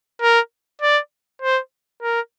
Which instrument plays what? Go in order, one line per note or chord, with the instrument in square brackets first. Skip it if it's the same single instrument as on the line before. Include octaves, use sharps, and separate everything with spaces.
[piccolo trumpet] A#4
D5
C5
A#4